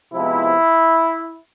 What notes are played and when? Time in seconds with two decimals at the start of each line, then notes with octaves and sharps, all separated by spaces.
0.13 C3 F3 G#3 B3 E4